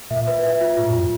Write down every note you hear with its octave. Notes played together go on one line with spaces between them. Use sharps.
A#2 E5
B4
E5
F4
A2 F4
F#2 F4